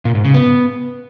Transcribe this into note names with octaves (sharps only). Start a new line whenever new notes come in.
A#2
G#2
C#3
B3